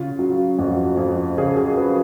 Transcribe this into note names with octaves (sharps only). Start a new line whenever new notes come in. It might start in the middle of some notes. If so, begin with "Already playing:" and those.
Already playing: C#3 F4
F#3
F2 F#4
F2
C#3 G#4
G#4
F#3 B4